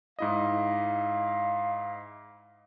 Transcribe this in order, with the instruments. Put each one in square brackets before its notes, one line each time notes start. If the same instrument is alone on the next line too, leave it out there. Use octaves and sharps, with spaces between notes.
[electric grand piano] G#2 E4 D#5 [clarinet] F5